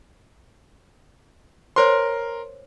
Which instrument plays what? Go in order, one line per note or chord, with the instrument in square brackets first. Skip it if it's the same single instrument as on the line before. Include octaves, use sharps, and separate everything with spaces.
[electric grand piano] A#4 C6 [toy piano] C5 C#5